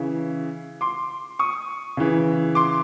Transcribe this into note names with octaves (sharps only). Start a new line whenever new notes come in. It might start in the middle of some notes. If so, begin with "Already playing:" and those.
Already playing: C#3 E3
C6 D6
C#6 D#6
C#3 E3
C6 D6